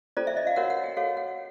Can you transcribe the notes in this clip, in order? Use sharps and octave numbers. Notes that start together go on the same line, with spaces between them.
C#4 F4 A4 C5 D5
E5
D#5
F5
F#4 A#4 C#5 F#5
F#5
G5
F#4 A4 C#5 F5
F#5